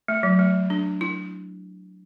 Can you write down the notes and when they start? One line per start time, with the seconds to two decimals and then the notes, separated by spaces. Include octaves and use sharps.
0.08 A3
0.23 F#3
0.39 A3
0.70 D4
1.01 E4